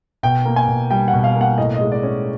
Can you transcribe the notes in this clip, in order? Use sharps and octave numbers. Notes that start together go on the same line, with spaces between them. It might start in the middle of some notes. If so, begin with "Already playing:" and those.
B2 G5
A#3
G#5
B2
G3 G5
F#5
B2
F5
A#3
F#5
A2 D#5
D#5
G#3
D5
C#4